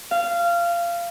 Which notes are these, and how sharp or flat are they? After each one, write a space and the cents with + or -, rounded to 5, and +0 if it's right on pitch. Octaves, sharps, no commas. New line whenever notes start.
F5 -20